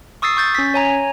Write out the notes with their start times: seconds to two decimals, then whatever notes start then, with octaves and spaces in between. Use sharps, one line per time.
0.22 C#6 D#6 E6 A6 C7
0.37 C#6 G6 A6
0.55 C#4 B6
0.74 C#5 G#5 A#5